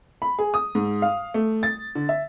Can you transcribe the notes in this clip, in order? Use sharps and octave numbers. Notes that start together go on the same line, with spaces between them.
B5
G#4
D#6
G#2
F5
A3
A6
D3
E5